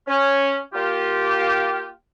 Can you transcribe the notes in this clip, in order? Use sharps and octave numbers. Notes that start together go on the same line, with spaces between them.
C#4
A#3 F4 G4